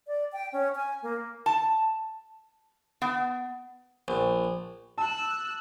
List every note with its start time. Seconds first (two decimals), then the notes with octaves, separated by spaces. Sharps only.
0.07 D5
0.32 G5
0.53 C#4
0.76 G#5
1.02 A#3
1.46 A5
3.02 B3
4.08 A#1
4.98 A5 E6 F#6